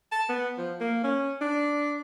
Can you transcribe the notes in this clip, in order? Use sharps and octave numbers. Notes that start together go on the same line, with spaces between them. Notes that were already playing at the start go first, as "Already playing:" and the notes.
A5
B3
F3
A#3
C#4
D4